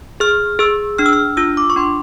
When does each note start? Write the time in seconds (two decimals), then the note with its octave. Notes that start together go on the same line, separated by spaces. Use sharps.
0.20 G#4 F6
0.59 G#4 E6
0.98 D4 F6
1.06 E6
1.13 F6
1.37 F4 E6
1.57 D6
1.70 C#6
1.76 D4 C6